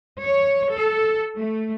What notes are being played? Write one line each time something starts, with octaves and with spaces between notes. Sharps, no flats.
C#5
A4
A3